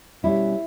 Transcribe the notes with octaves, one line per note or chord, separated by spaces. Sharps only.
B2 G3 C#4 E4